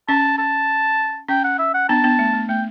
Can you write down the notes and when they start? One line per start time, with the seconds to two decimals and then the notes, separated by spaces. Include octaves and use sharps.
0.08 C#4 A5
0.38 A5
1.28 C#4 G5
1.44 F#5
1.59 E5
1.74 F#5
1.89 B3 D4 A5
2.04 B3 D4
2.19 A3
2.34 A3
2.49 A3 G5